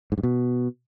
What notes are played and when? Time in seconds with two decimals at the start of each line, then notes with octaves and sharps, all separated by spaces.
0.12 G#2
0.18 G2
0.23 B2